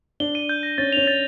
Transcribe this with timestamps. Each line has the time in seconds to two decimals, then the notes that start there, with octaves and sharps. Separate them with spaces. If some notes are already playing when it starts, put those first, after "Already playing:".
0.20 D4 G7
0.35 D#7
0.49 G6
0.63 A#6
0.78 C#4 A6
0.92 C#4 F7
1.07 A6